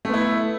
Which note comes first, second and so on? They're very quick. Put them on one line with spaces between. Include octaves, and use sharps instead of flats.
A3 B3 E4